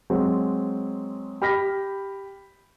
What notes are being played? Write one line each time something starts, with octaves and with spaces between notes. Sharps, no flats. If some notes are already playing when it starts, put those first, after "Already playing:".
F#3 G#3 C4
G4 B5 F6 A#6 B6